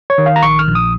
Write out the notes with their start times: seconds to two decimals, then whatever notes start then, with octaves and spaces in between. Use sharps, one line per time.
0.10 C#5
0.18 D#3
0.26 F5
0.36 A#5
0.43 A#1 C#6
0.59 F6
0.68 A#1
0.75 D#6